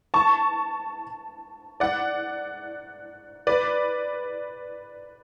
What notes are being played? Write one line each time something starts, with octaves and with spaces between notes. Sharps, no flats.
A5 C#6
D5 F#5
B4 D5